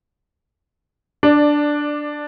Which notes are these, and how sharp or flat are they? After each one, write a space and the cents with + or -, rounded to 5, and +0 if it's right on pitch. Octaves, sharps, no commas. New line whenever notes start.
D4 +0 D5 +15